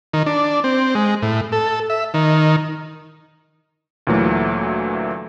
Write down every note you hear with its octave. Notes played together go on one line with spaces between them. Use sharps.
D#3
D4
C4
G#3
A2
A4
E5
D#3
D2 A#2 E3 F#3 A3